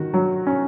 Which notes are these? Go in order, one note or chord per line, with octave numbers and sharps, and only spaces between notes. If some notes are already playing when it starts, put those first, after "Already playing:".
Already playing: D#3 F#4
F#3
C#4